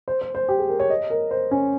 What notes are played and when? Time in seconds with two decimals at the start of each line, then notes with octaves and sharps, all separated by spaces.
0.08 C5
0.21 C5
0.35 C5
0.49 G4
0.59 G#4
0.69 A#4
0.80 C#5
0.90 D#5
1.10 A#4
1.31 C5
1.51 C#4